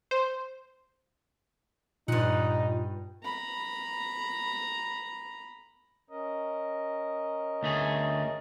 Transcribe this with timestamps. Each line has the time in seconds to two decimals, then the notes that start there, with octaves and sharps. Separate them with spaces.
0.11 C5
2.08 G2 A#2 D#4 F#5
3.23 A#5 B5
6.10 C#4 A#4 D#5
7.63 D2 A3 G#4